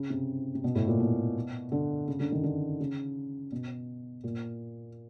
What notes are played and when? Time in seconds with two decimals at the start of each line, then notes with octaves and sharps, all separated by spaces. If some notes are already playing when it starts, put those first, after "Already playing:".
Already playing: C#3
0.10 C3
0.55 C3
0.64 B2
0.75 A2
0.88 A#2
1.00 B2
1.72 D3
2.08 C#3
2.20 D3
2.32 D#3
2.44 D3
2.80 C#3
3.52 B2
4.24 A#2